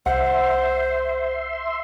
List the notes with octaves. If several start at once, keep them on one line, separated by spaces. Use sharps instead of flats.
C2 C5 E5 F#5 C6